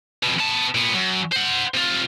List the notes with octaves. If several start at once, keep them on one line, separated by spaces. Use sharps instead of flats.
F2 B2
B3 A5
A#2 B3
F#2
C5 F#5
C3 F4